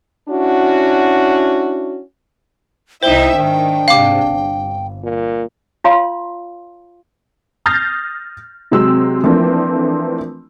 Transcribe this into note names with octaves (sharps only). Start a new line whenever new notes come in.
C#4 D4 E4 F#4
C2 D#4 E4 C5 E5 G5 G7
G#1 D#3 D4
G#2 C3 F5 D6
G1
A#2
F4 C#5 F5 A#5 C6
D#6 F6 G6 A6 A#6 C7
C3 F#3 G#3 C4 E6
E3 F3 A3 A#3 C4 D4